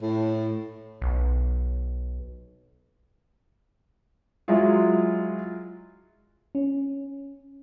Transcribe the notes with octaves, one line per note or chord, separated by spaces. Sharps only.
A2
B1
F#3 G#3 E4 F4
C#4